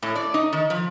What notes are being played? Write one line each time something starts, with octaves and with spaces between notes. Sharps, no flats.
A2
D5
D#4
D#3
F3